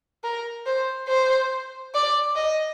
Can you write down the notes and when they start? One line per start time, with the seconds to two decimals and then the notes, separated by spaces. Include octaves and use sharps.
0.24 A#4
0.67 C5
1.08 C5
1.94 D5
2.36 D#5